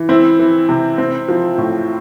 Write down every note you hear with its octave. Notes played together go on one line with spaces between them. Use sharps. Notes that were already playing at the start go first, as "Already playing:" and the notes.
Already playing: E3
C4 E4
E3
C3
C4
F3
A2